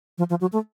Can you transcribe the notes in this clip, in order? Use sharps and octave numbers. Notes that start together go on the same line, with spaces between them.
F3
F3
F#3
A3